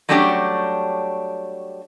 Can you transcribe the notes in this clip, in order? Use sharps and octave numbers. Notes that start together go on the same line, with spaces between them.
F#3 G3 A3 C#4 D4 G4